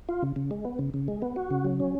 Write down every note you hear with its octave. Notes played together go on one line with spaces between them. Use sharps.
F4
C#3
C#3
G#3
B3
C#3
C#3
G#3
B3
F#4
C#3
F#3
C#4